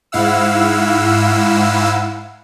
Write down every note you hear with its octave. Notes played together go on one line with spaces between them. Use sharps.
G#2 E4 F5 F#5 E6